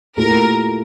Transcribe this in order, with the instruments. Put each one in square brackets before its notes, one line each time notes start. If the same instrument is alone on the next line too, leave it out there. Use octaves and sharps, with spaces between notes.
[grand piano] A#2 A3 E4 G4 [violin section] A#4